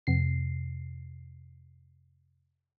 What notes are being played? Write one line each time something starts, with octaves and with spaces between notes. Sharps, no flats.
F2 C3 C7